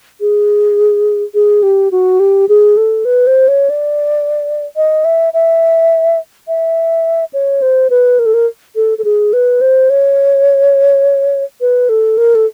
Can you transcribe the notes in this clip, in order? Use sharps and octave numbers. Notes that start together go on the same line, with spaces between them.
G#4
G#4
G4
F#4
G4
G#4
A4
B4
C5
C#5
D5
D#5
E5
E5
E5
C#5
C5
B4
A#4
A4
A#4
A4
A4
G#4
B4
C5
C#5
B4
A4
A#4
A4